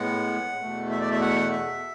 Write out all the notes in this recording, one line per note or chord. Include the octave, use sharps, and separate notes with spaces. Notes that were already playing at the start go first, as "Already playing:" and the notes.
Already playing: A2 G#3 B3 F#5
E2 B2 A3
E5
D5
E5
F#5
E5